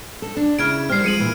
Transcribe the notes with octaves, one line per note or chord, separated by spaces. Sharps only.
A4
D4
C#3 E4 F6 G#6 D7
D#3 G3 C4 F6 C7
F3 G#3 C#7 D#7 F#7
A#2 E3